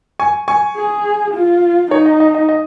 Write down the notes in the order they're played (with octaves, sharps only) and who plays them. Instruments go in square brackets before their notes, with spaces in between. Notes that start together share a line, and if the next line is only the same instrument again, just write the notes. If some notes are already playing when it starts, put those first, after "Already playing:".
[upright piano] G#5 C#6
G#5 C#6
[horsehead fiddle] G#4
F4
[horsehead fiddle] D#4 [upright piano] C#5
[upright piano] D#5
D#5
D#5
D#5